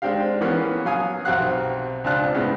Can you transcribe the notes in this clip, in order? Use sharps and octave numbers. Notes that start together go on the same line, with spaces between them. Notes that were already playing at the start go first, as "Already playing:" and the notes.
G#3 C4 D4 G4 F5
E3 A#3 B3 C#4
F#3 F5 G#5 D#6
B1 C3 C4 F#4 F5 F#6
C#2 C4 D4 F4 A5 F#6
A2 C#3 G#3 B3